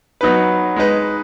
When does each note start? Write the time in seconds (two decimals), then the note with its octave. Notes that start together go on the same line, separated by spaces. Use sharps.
0.21 F#3 B3 D#4 B4
0.76 G#3 D#4 B4